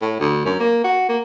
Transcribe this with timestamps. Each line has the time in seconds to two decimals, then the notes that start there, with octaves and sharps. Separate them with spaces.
0.02 A2
0.19 D2
0.45 F#2
0.60 A#3
0.84 F#4
1.09 A#3